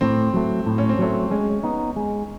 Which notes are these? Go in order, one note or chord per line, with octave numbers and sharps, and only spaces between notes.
A2 C4
F#3 A3
A2
C#4
C4
F#3 A3 C#4
G#3 C#4
B3 D#4
G#3